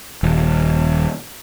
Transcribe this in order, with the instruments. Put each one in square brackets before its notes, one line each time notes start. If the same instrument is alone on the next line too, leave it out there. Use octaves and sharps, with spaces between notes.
[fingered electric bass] D#1